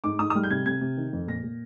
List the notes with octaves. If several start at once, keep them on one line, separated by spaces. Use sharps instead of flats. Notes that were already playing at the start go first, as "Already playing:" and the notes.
G#2 D6
G#2 D#6
D#6
G3 F6
G6
C3 G#6
C3 G#6
C3
D#3
F2
A#2 A#6
A#2